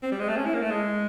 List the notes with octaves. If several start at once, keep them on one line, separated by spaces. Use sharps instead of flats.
C4
G3
G#3
A3
C#4
E4
A#3
A3
G#3